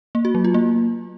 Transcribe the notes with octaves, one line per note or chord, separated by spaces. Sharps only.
A#3
F#4
F#3
F4
A#3